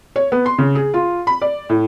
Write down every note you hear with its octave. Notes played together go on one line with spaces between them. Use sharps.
C#5
B3
C6
C#3
G#4
F4
B5
D5
A2